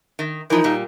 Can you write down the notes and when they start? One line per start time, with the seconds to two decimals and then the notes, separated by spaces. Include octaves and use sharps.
0.19 D#3
0.50 E3 F3 D#4 A#4
0.64 A#2 G3